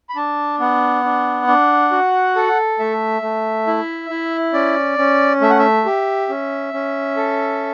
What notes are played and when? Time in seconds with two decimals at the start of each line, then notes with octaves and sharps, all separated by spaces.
0.09 B5
0.16 D4 A5
0.60 B3 F#5
1.04 D4
1.47 D4
1.92 F#4
2.36 A4
2.79 A3 E5
3.22 A3
3.67 E4
4.10 E4
4.54 C#4 D5
4.98 C#4
5.41 A3 E5
5.50 F#5
5.59 E5
5.85 G4
6.29 C#4
6.74 C#4
7.17 A4